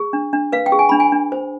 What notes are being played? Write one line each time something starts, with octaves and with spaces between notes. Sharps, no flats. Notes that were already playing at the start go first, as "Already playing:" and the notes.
Already playing: G#4
D4
D4
B4 F5
G5
G#4
G#5
D4 B5
G#5
D4
C5